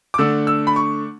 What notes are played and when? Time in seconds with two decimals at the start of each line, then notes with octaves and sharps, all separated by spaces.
0.14 D6
0.18 D3 A3 D4 E6
0.47 E6
0.67 B5
0.76 C#6